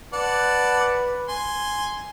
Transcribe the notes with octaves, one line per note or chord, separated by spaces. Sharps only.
B4 D5 F#5 A5
G#5 C6